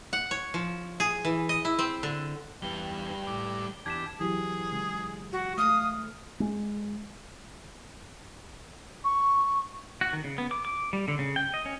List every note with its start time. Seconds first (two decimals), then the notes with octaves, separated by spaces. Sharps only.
0.13 F#5
0.31 C#5
0.54 F3
1.00 G#4
1.25 E3
1.49 D#5
1.65 E4
1.79 C4
2.03 D3
2.62 E2 G3 B4 G5 G7
3.27 A2 D6
3.86 E2 D4 G4 A5 G#6 B6 E7
4.20 E3 F#3 G4 G#4
4.72 C#3 G#3
5.33 F#4
5.58 A3 F5 D#6
6.40 G#3
9.04 C#6
10.01 F#4
10.13 D#3
10.24 C#3
10.38 B3
10.51 D6
10.65 D6
10.93 G3
11.08 D3
11.19 C#3
11.36 G5
11.54 D#5
11.66 C#4